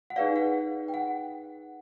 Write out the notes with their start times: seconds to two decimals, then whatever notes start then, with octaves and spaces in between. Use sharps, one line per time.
0.10 F#5
0.16 D#4 G#4 B4 D5 F5
0.36 F#5
0.88 G5
0.94 F#5